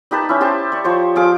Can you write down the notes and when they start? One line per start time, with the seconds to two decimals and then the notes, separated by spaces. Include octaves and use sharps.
0.11 D#4 G4 B4 A5
0.29 C#4 E4
0.41 G4 C5 A5
0.72 D5 C#6
0.84 F3 C5 C#5
1.16 F3 G#4 F5 D6